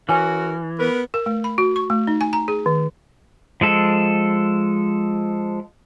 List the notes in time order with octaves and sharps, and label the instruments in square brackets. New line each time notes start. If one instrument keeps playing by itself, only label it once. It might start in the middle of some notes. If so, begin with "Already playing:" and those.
[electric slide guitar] E3 [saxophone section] C#4 F#4 A#4 [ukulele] C#5 G#5
[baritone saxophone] B3 [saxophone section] A#4 B4
[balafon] A#4
A3
B5
F#4
C#6
A3
D#4
G#5
A#5
G#4
D#3
[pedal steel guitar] F3 G#3 A4